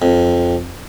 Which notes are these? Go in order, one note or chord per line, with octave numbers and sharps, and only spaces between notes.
F2